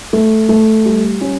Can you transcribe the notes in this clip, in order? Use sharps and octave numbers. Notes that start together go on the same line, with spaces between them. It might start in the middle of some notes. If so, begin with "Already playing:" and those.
A3
A3
G3
C#4